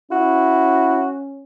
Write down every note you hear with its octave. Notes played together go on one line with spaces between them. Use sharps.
C#4 E4 F#4